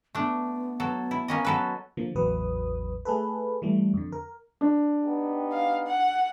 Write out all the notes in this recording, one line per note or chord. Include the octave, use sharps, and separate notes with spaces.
A3 B3 D4
F#3 A4
E4
A#3 C#4 D#5
F#3 A4 B4
D3 F3 A#3
A1 E2 F#3 B4 D#6
A3 G#4 A4 B4
E3 G3 A3
F2 D3
A#4
D4
B3 D#4 G4
F5
F#5